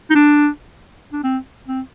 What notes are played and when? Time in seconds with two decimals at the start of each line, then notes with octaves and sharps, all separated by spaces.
0.10 D#4
0.15 D4
1.13 D4
1.24 C4
1.68 C4